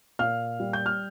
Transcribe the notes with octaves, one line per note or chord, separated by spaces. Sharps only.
A#2 F5 F6
G3
G6
F6